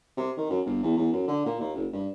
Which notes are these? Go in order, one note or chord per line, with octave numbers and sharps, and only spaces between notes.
C3
D#3
F#2
G1
E2
E2
F#2
D3
A#2
D#2
F#1
G2